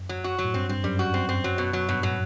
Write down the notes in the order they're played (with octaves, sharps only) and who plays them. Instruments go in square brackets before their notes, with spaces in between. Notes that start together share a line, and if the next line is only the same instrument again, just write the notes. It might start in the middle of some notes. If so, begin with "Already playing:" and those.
Already playing: [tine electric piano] F#2
[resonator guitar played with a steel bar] F#3
F#4
F#3
[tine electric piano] A2
[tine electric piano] G2 [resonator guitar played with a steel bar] C4
[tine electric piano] G2 [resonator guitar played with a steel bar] C4
[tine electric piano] F#2 [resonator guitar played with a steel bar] G3
[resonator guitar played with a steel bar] F#4
C4
C4
F#3
B2
F#3
[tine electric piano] G2 [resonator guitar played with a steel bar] B2
[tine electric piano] A2 [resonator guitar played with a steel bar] F#3